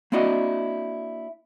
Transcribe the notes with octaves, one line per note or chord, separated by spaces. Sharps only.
A#3 C4 D4 E4 F#4 D#5